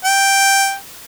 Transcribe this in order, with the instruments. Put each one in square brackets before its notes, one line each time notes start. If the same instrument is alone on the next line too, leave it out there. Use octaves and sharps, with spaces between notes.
[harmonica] G5